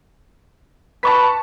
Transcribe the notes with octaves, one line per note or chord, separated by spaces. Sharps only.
B4 A5 C#6 B6